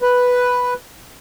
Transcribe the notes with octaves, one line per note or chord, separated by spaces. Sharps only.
B4